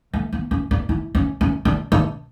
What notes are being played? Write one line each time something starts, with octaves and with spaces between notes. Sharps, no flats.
A3
B3
C#4
D4
E4
C#4
C#4
D4
D4